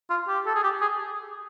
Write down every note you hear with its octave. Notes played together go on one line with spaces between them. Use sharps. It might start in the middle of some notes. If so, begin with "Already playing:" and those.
F4
G4
A4
G#4
G4
G#4